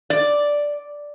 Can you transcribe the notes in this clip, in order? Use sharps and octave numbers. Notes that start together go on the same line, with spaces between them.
D5